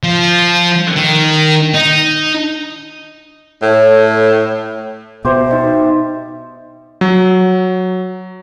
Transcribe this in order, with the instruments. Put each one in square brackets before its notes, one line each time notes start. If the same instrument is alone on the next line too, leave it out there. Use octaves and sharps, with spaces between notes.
[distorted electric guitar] F3
D#3
D#4
[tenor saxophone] A2 [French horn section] A4 C#5
[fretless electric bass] B2 [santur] G4 C5 [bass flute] E5
[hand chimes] D#4 D#5
[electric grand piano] F#3